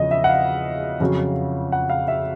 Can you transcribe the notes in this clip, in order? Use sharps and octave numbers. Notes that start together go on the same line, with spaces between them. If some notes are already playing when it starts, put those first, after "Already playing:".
Already playing: E2 C#3 F3 D#5
E5
F#5
F5
F2 C#3 F#3
F#5
F5
E5